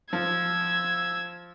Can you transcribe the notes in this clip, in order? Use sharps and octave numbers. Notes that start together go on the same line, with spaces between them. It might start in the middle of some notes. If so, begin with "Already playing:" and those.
F3 E6 G#6